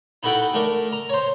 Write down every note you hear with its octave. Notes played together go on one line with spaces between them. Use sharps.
D#4 E4 F#4 A4 F#5 G5
A3 D4 A#4 C#6
A#5
C5 C#5